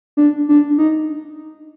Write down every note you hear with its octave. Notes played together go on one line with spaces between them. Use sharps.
D4
D4
D#4